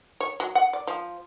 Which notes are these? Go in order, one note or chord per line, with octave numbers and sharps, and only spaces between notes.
C#5
F#3
F#5
D5
F3